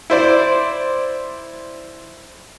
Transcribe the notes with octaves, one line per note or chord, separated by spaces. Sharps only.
E4 C5 D5